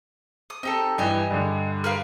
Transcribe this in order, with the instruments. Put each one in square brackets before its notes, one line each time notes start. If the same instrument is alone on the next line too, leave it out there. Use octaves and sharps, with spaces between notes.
[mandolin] D#6
[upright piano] C4 [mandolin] D#4 G4 A4
[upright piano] G2 E3 [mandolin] G4 D#5 G#5
[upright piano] G2 D3
[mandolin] A#4 B4 F5